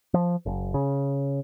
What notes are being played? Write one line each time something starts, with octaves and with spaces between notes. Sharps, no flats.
F3
F#1
C#3